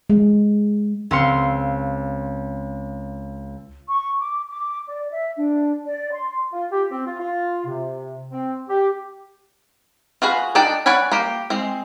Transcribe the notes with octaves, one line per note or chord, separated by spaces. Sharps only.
G#3
C#2 C4 F5 C6 C#7
C#6
D6
D6
D5
E5
D4
D5
C6
F4
G4
C4
F4
F4
C3
C4
G4
F4 F#4 G#4 B4
D4 D#4 D5 G5 A5
C#5 D5 F#5 G#5 B5
A#3 G4
G#3 C4